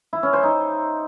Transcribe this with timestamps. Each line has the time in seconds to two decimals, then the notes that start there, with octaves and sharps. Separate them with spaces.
0.13 E4
0.23 C#4
0.33 C5
0.43 D#4